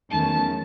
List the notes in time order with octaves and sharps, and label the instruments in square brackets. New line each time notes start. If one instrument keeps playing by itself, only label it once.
[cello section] E2 D#3 F#3 A3 C#4 [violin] A5